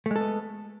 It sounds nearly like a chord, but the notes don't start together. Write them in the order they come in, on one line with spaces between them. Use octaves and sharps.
A3 G#3 A4 B3